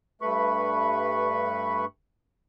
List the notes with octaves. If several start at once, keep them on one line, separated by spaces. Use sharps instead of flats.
G2 A3 B4 B5 C#6